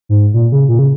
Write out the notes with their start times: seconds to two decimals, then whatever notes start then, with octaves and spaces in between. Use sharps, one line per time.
0.09 G#2
0.34 A#2
0.52 C#3
0.69 A#2
0.79 C#3